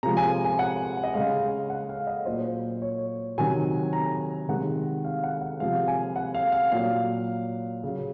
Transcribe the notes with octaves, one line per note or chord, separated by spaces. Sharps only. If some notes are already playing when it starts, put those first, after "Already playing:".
C3 F3 G#3 A#5
G#5
G#5
F#5
D#5
C#3 G#3 F5
F#5
F5
D#5
A#2 F#3 C5
C#5
C3 D#3 F#3 G#5
A#5
C3 D#3 G#3 F#5
F5
F#5
F#5
C3 F3 G#3 F5
G#5
F#5
F5
F5
A#2 F#3 F5
C#3 F#3